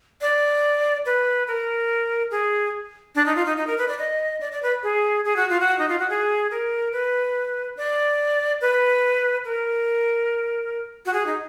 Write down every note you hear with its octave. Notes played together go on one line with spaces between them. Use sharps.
D5
B4
A#4
G#4
D4
D#4
F4
D#4
D#4
A#4
B4
D5
D#5
D5
D5
B4
G#4
G#4
F#4
F4
F#4
D#4
F4
F#4
G#4
A#4
B4
D5
B4
A#4
F#4
G#4
D#4